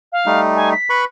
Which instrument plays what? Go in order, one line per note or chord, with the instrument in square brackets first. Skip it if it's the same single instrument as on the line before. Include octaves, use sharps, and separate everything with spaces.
[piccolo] F5
[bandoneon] G3 A3 D#4
[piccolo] G#5
B6
[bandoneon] B4 B5 C#6